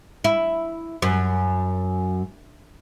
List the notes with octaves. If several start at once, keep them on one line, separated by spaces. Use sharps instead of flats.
E4
F#2